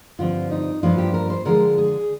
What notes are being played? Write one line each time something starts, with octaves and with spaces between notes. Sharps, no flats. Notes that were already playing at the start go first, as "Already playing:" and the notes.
G2 D3 F3 C4 F4
D#4
G2 F3 A#3 D4 F4
G4
A#4
C5
D3 F3 G#3 A#4
G#4